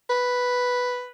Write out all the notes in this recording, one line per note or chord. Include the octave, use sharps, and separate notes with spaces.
B4